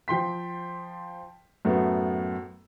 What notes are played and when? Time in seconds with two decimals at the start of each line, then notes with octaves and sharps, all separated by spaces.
0.08 F3 G5 C6 B6
1.65 F#2 A2 A3 B3